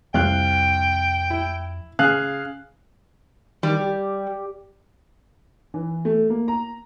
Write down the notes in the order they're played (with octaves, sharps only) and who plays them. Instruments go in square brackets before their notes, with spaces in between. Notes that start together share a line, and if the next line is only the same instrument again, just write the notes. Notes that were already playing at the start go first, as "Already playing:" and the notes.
[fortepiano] C2 F5 F#6 [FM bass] F2 [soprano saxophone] G5
[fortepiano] E4
[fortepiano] C#3 [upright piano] G#4 F5 F#6
[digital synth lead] D#3 [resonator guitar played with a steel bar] G3
[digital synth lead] G4
[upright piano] E3
A3
A#3
A#5